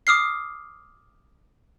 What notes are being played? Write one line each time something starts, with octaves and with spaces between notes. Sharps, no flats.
D6 D#6 F6 C7